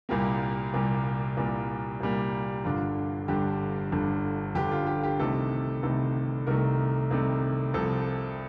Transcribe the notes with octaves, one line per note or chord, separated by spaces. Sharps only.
C2 A#2 G3 A#3 G4
C2 A#2 G3 A#3
C2 A#2 G3 A#3
C2 A#2 G3 A#3
G1 G2 D3 F4
G1 G2 D3 G4
G1 G2 D3
G1 G2 D3 G4
F4
G4
G4
C2 C3 D#3 A3 A4
C2 C3 D#3 A3 A4
C2 C3 D#3 A3 A#4
C2 C3 D#3 A3
C2 C3 F3 A4